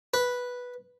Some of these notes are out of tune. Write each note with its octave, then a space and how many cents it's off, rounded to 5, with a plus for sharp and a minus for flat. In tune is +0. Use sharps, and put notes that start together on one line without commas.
B4 -5